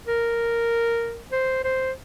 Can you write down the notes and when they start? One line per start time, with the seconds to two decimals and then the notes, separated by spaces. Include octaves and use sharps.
0.07 A#4
1.32 C5
1.64 C5